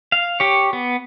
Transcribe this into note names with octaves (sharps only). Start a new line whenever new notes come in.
F5
G4 C#5
B3